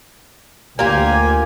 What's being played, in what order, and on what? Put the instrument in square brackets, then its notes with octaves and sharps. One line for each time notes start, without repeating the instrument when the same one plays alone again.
[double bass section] D2 [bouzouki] A#3 F4 G4 [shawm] G#5